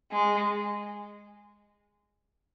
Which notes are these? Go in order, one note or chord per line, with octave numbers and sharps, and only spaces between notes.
G#3